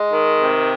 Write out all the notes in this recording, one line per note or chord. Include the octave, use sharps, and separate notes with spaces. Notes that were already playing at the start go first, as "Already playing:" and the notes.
Already playing: G#3
D#3
C3